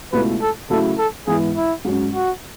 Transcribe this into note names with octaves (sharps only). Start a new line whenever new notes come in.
C#2 B2 A3 E4 B4
A4
C#3 F#3 A3 E4 A4
A4
G#2 E3 B3 E4 G#4
E4
G#2 F#3 C#4
F#4